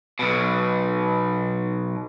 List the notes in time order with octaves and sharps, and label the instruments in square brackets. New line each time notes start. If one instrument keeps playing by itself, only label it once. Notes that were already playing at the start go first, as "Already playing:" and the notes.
[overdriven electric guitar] B1 B2